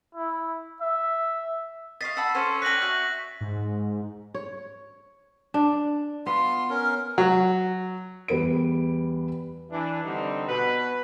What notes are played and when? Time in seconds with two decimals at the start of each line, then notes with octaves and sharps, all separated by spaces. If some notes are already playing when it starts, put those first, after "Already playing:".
0.15 E4
0.81 E5
2.01 D#5 F5 C#6 A6 B6 C7
2.17 F#5 A5 B5 E6
2.35 C#4 A4 C5 E6
2.62 D5 G5 F#6 A#6 B6 F#7
2.82 F#4 E5 G6
3.41 G#2
4.34 C#5
5.54 D4
6.26 B3 F4 C6
6.70 C#4 A#4
7.18 F#3
8.28 E2 G3 B4 D7
9.71 E3 D4
10.03 D3 G3 C4 D#4
10.47 B2 B4